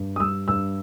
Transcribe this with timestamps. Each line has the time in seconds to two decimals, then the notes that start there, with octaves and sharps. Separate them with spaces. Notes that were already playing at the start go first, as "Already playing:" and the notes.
Already playing: G2
0.16 D#6
0.20 G3 E6
0.48 G2 E6